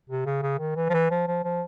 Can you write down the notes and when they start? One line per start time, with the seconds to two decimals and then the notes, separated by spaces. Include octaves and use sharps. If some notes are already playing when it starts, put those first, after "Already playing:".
0.09 C3
0.26 C#3
0.42 C#3
0.59 D#3
0.76 E3
0.89 F3
0.94 E3
1.11 F3
1.27 F3
1.44 F3